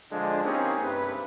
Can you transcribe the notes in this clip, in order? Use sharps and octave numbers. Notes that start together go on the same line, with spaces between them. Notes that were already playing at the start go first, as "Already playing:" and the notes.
D3 F3 G#3 D4
A#3 C4 C#4 D#4 G4 G#4
G2 C3 B4